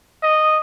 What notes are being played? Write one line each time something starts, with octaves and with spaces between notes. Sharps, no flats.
D#5